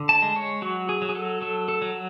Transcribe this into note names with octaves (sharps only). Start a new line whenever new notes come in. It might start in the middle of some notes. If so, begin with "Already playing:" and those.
Already playing: D3
A5
G#3
C#5
F#3 F#4
G#4
F#3
G#4
A4
F#3 A4
A4
F#3